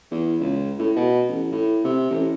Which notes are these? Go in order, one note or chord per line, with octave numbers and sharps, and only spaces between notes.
E2
C#2
A2
B2
A1
A2
C3
A1